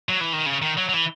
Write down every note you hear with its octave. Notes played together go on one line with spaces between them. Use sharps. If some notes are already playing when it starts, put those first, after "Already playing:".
F#3
E3
D#3
C#3
D#3
F#3
F#3
E3